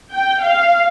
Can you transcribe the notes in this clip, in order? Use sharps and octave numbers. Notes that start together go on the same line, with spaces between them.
G5
F5